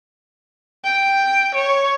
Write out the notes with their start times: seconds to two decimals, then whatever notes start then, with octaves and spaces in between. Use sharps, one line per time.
0.84 G5
1.54 C#5